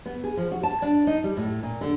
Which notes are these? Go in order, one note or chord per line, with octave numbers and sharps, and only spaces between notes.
B3
G#4
F3
F#4
A5
D4
D#4
G3
A2
A#2
D3